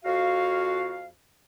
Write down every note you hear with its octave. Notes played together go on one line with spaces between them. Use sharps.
F2 F#4 F5